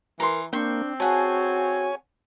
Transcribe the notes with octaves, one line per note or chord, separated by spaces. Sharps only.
E3 A#4 A#5 C6
A#3 C4 D4 C5 G5 C#6
F#4 G#4 C#5 F#5 G#5 A5